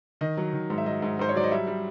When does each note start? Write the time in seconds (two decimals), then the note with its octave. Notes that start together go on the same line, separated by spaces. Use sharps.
0.21 D#3 D#5
0.37 F#3
0.53 D#3
0.70 G#2
0.78 E5
0.86 F#3 D#5
1.02 G#2
1.19 G#2 C5
1.29 C#5
1.35 F#3 D5
1.44 D#5
1.51 G3 E5
1.67 G3